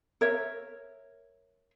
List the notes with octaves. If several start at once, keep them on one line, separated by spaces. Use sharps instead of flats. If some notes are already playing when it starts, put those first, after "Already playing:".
A#4 C#5 E5